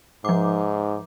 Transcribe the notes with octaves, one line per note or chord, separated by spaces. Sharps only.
G#2 F3 D6